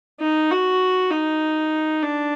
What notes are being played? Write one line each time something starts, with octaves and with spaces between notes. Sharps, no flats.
D#4
F#4
D#4
D4